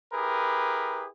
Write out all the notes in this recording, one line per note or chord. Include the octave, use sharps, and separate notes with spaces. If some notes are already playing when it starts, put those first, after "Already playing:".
E4 G4 G#4 A#4 B4